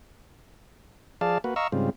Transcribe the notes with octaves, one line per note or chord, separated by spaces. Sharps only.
F3 G#4 D5 F5 A5
A#3 F#4 B4
D#5 F5 A#5 C#6 E6
G#2 C#3 G3 C4 F4